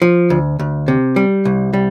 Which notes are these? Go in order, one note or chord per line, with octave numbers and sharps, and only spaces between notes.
F3
D2
D2
C3
G3
C2
G3